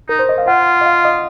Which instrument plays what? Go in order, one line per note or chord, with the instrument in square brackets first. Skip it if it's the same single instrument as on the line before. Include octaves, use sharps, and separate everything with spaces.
[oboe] D#4 [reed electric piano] A#4
[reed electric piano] C5
D#5
F5
[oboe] F4 [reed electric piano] F#5
[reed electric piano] D#5
F5
D#5